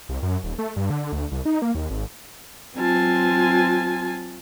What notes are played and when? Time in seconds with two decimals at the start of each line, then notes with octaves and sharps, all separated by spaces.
0.09 C2
0.23 F#2
0.44 D#1
0.58 A3
0.76 G2
0.90 D3
1.12 D2
1.32 C2
1.46 D#4
1.62 A#3
1.75 D#2
1.90 G#1
2.77 F#3 C4 F4 G#5 A5